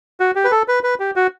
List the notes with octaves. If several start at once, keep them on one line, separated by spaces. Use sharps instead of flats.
F#4
G4
B4
A4
B4
B4
G4
F#4